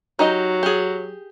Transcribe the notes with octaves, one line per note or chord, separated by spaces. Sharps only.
F#3 D#4 G4 D#5
G4 G#4